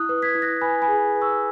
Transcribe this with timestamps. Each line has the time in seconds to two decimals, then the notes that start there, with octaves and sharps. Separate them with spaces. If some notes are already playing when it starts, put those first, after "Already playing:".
Already playing: E4 D#6 F#6
0.09 B4
0.22 G#6 B6
0.35 E4
0.42 F#6 A#6
0.61 B4 G#5 B5
0.82 G#5 B5
0.88 G#4
1.15 B4
1.21 C#6 E6